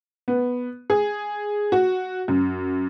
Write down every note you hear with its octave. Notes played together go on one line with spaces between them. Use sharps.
B3
G#4
F#4
F#2